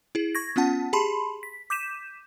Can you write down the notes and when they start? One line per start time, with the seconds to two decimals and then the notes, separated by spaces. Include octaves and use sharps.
0.15 E4 G#4
0.35 C#6 G#6 A#6
0.56 B3 C#4 F4 F#5 A5
0.93 G4 G#4 A5 B5 C6
1.43 B6
1.70 D6 G6 B6 D#7 E7